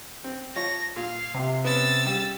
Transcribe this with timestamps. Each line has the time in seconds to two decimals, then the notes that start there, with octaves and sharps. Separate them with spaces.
0.24 C4
0.56 F3 C#5 A#6
0.96 A#2 F5
1.34 C3
1.64 B3 C#4 E6 A6
2.05 C#3 G3 G4